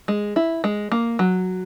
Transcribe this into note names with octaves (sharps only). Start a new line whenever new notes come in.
G#3
E4
G#3
A#3
F#3